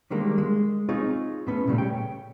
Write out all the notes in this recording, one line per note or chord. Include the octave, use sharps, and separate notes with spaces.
D3 D#3 G3 G#3 A#3
G#3
C4 D#4 F4 G#4 C#5
A2 B3 C#4
A#2 C#3 F#3 G3 A3
C#5 G5